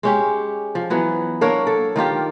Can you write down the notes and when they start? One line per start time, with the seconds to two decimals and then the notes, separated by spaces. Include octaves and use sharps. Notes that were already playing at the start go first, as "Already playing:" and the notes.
0.03 G#3 C#4 G4
0.75 F3
0.90 E3 F#3 B3
1.41 A#3 D4 A#4 C#5
1.67 A4
1.96 D#3 A#3 F4 G4